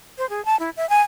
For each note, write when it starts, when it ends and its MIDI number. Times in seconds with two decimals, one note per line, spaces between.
0.18 0.28 72
0.30 0.44 68
0.45 0.58 81
0.59 0.70 64
0.77 0.88 76
0.90 1.02 80